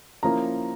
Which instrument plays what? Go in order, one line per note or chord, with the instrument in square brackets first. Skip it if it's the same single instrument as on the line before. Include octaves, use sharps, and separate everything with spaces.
[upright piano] F3 A#3 C#4 E4 A#5